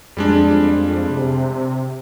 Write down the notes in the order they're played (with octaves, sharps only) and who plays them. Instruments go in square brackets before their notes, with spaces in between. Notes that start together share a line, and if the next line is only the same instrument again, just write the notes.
[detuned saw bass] F2 [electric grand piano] G3 G#3 D4
[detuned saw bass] C3